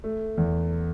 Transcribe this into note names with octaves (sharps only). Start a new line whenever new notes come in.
A3
E2